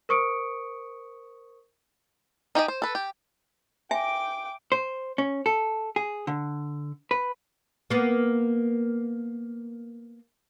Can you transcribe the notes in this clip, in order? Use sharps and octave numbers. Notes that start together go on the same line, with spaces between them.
A#4 C5 C#6 D#6 C#7 D7
D#4 G4 G#4 D#5
C5
A4 B4
G4
E5 G5 G#5 D6
C5
C#4
A4
G#4
D3
B4
A#3 B3